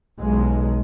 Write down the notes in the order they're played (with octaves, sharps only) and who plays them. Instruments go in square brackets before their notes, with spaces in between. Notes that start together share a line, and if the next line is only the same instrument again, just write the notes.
[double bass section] B1 G#3